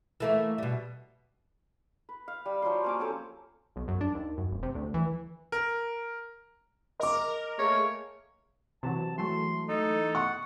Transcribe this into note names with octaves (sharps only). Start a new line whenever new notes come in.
E3 A3 A#3
B2 G3
B4
F5
G3
F3 F#3 G4 C6
A#3 C#4 D6
C4 C#4 A4 C5
B1
F#2
D4
D#2
F#2
F1
C3
D2
E3
A#4
A#4 D#5 D6
A3 A#3 G#4 C#5
C3 E3 F#3 A5
E3 F#3 G#3 A3 C6
D#4 A4
F#5 C#6